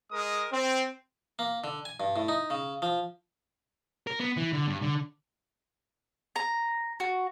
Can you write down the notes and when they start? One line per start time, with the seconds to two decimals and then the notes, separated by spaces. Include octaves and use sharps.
0.12 G#3 A#4 D#6
0.52 C4
1.39 A#3
1.64 D3
1.85 G#5
2.00 G2
2.16 A2
2.28 D#4
2.50 C#3
2.82 F3
4.07 A#4
4.20 B3
4.37 E3
4.53 D3
4.67 G2
4.82 D3
6.36 A#5
7.00 F#4